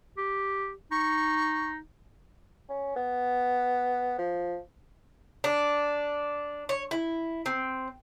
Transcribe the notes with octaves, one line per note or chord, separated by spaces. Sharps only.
G4
D#4 C#6
C#4
B3
F3
D4
C#5
E4
C4